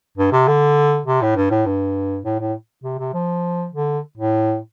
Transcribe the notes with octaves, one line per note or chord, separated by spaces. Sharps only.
G2
C3
D3
C3
A2
G2
A2
G2
A2
A2
C3
C3
F3
D3
A2